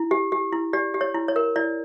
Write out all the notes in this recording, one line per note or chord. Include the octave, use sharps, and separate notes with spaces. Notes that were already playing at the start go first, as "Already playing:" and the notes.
Already playing: E4
G4
G4
E4
G4 D5
G4
C#5
E4
C#5
A#4
E4 D5